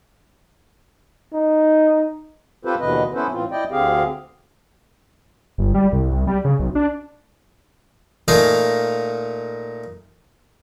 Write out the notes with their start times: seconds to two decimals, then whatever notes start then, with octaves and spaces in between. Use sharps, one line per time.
1.34 D#4
2.65 C4 F4 G4 A4 B4 C5
2.80 D#2 B2 D3 E3 B4 D#5
3.14 B3 C#4 E4 A4 B4 C5
3.32 A2 E3 C4 F4
3.51 E4 D5 D#5 G5
3.71 D2 D3 C4 G4 G#4 F5
5.58 G1
5.74 G3
5.92 C2
6.12 C2
6.27 G3
6.44 C#3
6.59 B1
6.75 D4
8.28 A#2 A3 D#4 F5 G#5 A#5